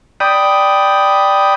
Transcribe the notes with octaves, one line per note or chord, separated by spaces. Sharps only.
D5 G5 B5 D#6